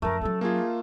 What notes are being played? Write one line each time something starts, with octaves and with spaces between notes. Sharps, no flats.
F#2 F3 A3 A#4
F#3 C#4 A4
A#3 F4 G#4